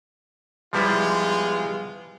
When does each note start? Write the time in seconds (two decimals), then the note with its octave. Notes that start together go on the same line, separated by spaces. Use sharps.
0.73 F3 G3 G#3 B3 E4 F4